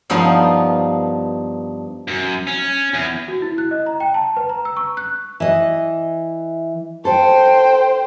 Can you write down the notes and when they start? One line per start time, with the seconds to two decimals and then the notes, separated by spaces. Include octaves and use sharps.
0.10 G2 F3 B3 D#4 F5
2.08 F#2
2.47 C#4
2.94 E2
3.28 F#4
3.42 E4
3.58 F#6
3.71 D#5
3.86 A#5
4.00 G5
4.14 A5
4.37 B4
4.49 A#5
4.65 E6
4.77 C#6
4.97 F#6
5.40 E3 D#5
7.05 A4 C5 G5